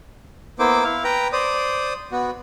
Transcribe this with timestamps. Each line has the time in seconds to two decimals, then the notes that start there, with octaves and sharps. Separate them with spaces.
0.59 A#3 B3 E4 C5 D6
0.84 E4 F5
1.04 B4 G5 A#5
1.33 C5 D5 D#6
2.12 B3 F#4